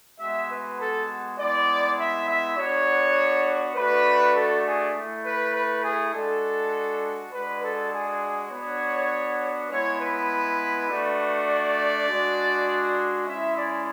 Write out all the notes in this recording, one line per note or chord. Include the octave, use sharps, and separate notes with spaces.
G#3 B3 F#4 E5
B4
A4
G#3 B3 E4 D5
E5
E5
B3 D4 F#4 C#5
A3 D4 F#4 B4
A4
G#4
A3 E4
B4
B4
G#4
G#3 D4 F#4 A4
G#3 D4 F#4 B4
A4
G#4
B3 D4 F#4 C#5
G#3 B3 E4 C#5
B4
A3 D4 F#4
D5
G#3 D4 F#4
G#3 C#4 E4 E5
D5